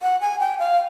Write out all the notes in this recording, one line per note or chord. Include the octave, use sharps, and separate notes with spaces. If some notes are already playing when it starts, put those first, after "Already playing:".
F#5
G#5
G5
F5